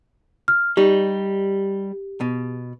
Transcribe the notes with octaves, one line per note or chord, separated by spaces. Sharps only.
F6
G3 D#4 G4
B2